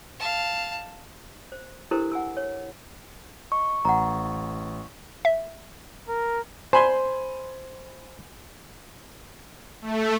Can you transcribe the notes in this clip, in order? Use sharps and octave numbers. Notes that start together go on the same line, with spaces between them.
F5 A5
C5
D4 E4 G4 A4 A#4 C5
F#5 G#5 E6
C#5
D#5 C#6
A1 F#5 A#5
E5
A#4
C5 G#5 B5 C6
A3